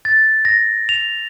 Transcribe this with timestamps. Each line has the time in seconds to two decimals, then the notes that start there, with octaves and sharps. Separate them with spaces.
0.05 A6
0.45 A#6
0.89 F7